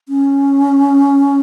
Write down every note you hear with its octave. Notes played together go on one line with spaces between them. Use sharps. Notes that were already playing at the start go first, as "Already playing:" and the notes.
C#4